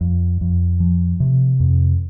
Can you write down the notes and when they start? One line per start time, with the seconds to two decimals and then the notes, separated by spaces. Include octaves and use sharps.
0.01 F2
0.41 F2
0.80 F3
1.20 C3
1.60 F2